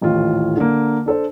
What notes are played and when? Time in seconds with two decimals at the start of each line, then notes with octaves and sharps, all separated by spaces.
0.01 D#1 A1 A2 F4
0.57 D3 A#3
1.06 D4 A4 C5